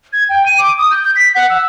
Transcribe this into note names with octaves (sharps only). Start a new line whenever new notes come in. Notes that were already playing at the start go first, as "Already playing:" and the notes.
G#6
G5
D#7
D6
D#6
G6
G6
B6
F#5
E6